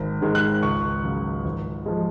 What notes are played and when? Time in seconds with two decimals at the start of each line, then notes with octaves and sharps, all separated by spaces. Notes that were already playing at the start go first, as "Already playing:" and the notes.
Already playing: G#1
0.21 G#2 D#3 G#3
0.35 F#6
0.63 C#2 C#6
1.04 C#3 F#3
1.45 G#1
1.86 F3 G#3